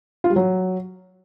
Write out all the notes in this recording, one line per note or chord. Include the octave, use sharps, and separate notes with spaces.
F4
G3
F#3